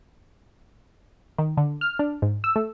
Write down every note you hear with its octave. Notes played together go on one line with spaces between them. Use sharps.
D#3
D3
F6
D4
G#2
E6
A3